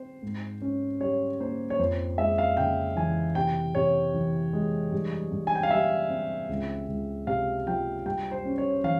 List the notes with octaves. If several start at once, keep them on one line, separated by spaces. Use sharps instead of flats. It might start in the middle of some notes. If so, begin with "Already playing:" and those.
Already playing: C4 C5
G#2
C#4
G3 C#5
A#3 C5
C#5
F2 C5
G#3 E5
F5
C#3 G5
E3 G#5
C3 G5
C3 C#5
E3
G#3
G2
G2
G#5
G5
F5
G3 E5
C4
C#2
C#2
C3 F5
F3 G5
G2 G5
C5
C#4
C#5
E3 F5